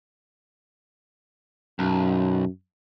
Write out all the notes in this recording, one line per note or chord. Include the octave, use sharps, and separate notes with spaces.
B1 F#2